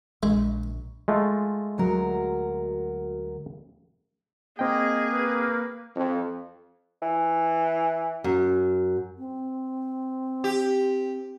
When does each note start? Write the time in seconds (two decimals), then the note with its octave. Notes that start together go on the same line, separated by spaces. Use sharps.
0.23 A#1 G#3
1.08 G#3 A3 F4
1.78 D2 F#3 A#4
4.59 A#3 C4 G#4 D#5 G5
5.13 B4
5.95 F2
7.02 E3
8.24 F#2
9.18 C4
10.44 G4